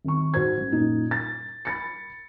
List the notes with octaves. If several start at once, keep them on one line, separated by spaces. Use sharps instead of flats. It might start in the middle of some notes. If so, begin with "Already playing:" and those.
G#1 C#6
G#2 F#4 C5 G#6
A1
F#2 A#2 D#4
A6
B5 A6 C#7